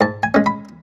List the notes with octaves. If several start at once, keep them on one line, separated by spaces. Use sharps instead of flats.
G#2 A5
G#5
G#3 C#4
B5